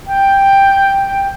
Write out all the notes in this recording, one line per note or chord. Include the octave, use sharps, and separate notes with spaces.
G5